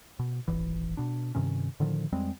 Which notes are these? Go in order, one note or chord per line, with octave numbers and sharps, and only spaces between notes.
B2
D#1 G#1 E3
B2 D4
G2 C3 D#3 C#4
A2 D3 D#3 F3
F2 G3 G#3 C4